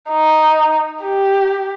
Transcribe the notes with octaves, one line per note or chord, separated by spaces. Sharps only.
D#4
G4